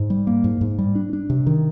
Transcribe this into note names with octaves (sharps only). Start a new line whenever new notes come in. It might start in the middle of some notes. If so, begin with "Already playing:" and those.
Already playing: G#2
G3
A#3
G#2
G#2
G3
D4
D4
C3
D#3